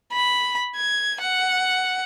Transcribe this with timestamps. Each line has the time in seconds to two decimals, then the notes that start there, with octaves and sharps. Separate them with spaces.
0.13 B5
0.76 G#6
1.21 F#5